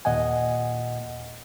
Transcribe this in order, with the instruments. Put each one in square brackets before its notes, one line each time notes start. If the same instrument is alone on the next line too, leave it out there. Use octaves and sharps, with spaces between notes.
[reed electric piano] D#2 A#2 D#5 F#5 G#5